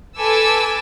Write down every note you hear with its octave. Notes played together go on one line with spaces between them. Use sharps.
A4 B4 G#5 D6 E6 A6